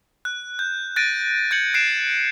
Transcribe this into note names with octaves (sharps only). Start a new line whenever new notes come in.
F#6
G6
F#6 A6 A#6 D7 D#7
G6 G#6 C#7 F#7
F#6 C7 D7 E7